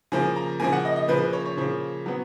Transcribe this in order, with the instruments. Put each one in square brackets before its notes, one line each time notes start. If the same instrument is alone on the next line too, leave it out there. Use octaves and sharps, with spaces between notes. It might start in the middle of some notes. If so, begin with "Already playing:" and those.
[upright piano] C#3 F3 A#3 G#5
A#5
C#3 F3 A#3 G#5
F#5
D#5
D#5
C#3 F3 A#3 B4
B4
C#5
C#5
C#3 F3 A#3
F#3 B3